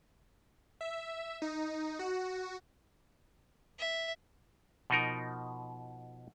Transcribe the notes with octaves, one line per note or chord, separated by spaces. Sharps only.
E5
D#4
F#4
E5
B2 F3 D#4 A#4